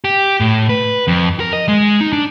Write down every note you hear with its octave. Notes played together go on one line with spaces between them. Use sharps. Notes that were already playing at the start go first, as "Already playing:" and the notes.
G4
A2
B4
F2
A#4
D#5
G#3
D#4
D4